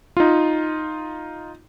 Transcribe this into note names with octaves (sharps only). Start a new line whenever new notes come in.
D#4 F4